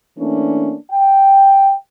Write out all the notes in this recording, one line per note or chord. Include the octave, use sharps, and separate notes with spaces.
E3 A3 A#3 C#4 D4
G5